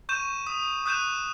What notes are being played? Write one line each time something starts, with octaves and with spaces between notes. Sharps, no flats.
C#6 G6 D#7 E7
D#6
D#6 F#6 G6 D#7 E7